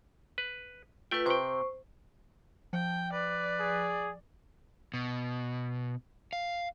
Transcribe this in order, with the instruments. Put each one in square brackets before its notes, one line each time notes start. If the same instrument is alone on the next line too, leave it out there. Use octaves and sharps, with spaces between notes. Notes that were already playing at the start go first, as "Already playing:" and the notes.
[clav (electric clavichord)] B4
[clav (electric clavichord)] A3 G5 [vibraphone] F4 B4
[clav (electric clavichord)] C3 G5 [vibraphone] C5 C#6
[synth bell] F3 [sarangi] G5
[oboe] B4 [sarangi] D5
[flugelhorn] G#4
[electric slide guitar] B2
F5